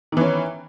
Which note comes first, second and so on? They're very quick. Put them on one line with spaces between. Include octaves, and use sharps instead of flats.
D#3 E3 C#4